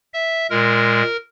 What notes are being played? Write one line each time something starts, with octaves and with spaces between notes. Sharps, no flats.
E5
A#2 G#3 A#4